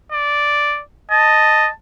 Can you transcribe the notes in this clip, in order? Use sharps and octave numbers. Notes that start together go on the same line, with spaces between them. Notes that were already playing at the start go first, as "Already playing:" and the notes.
D5
D#5 A5